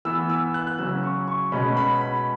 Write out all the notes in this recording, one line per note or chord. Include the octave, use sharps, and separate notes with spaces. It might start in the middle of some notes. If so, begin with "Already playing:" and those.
E3 B3 E6
E6
F#6
F#6
C#3 F#3 C#4 E6
C#6
C#6
B2 G#3 C#4 B5
B5
B5